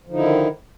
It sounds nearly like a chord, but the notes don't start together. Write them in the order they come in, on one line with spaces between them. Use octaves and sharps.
F3 D3 D#4 E4 D#3